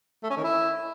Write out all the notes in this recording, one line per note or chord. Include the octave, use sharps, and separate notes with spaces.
A3
C#4
D#3
E4